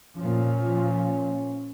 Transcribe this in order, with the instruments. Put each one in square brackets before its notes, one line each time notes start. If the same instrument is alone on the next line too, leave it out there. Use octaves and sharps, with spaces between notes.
[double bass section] A#2 F3 [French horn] C#4